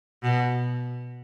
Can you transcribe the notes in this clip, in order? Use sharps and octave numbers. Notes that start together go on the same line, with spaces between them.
B2